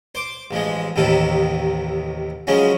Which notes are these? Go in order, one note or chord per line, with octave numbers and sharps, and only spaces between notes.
C5 D6
A1 F3 G#3
A1 D#2 A2 C3 D#3 A4
C#3 F3 F#3 G#3 C#4